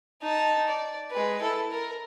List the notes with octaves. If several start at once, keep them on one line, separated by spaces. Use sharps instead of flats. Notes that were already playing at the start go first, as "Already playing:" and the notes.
D#4 A5
D5
G#3 B4
E4 A4
A#4